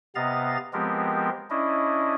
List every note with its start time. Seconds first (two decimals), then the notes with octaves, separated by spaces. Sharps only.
0.15 C3 B3 D#5 F5 A#5 A6
0.73 F3 G#3 B3 C4 G4 A#4
1.50 C#4 D4 E4 D#5